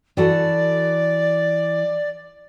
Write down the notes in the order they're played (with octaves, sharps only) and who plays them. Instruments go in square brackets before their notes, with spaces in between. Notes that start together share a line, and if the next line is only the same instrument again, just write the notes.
[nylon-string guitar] E3 F#4 A4 [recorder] D5